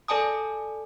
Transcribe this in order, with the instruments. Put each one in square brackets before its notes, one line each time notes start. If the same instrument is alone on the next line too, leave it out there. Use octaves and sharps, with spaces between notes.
[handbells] A4 D5 G#5 A5 D#6